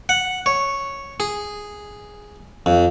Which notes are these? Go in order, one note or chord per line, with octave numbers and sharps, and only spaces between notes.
F#5
C#5
G#4
F2